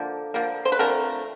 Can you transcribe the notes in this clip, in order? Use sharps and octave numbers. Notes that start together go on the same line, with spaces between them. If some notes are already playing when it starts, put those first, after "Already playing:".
Already playing: D3 F3 A#3
D3 F3 A#3
C5
B4
D3 F3 A3 C4 A#4